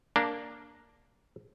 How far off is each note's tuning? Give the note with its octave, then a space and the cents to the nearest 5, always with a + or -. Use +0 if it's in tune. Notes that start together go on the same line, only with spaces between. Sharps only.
A#3 +0 D4 +0 A#5 +0